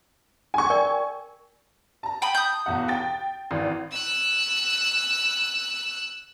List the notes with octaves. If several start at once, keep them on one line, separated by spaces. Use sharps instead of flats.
G#5 C#6
A#4 D5 G5
A5 A#5
G5 B5 D#6
D#6 G6
B1 E2 F#5
G5 A6
G#1 E3
E6 F#6